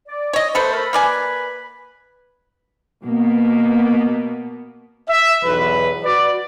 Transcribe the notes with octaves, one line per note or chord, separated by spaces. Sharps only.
D5
C#5 D#5
A3 A4 B4 C5
A#4 E5 B5
A#3 B4 D5 G#5 B5
B2 A#3 B3
E5
B1 E2 B4
F#4 B4 D5